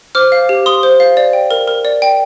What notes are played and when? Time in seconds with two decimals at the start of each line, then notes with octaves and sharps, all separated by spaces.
0.15 C5 D6 F6
0.32 F5
0.49 G4
0.66 G4 C6 D#6
0.83 C5
1.00 F5
1.17 D5
1.33 G5
1.51 A#4
1.68 A#4
1.85 D5
2.02 G5